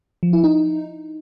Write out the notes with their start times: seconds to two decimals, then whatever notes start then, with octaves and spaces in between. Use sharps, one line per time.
0.23 F3
0.33 E4
0.44 D#4